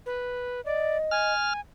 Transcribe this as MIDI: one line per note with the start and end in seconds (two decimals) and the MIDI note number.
0.06 0.61 71
0.65 0.97 74
0.65 1.33 75
1.11 1.60 80
1.11 1.53 89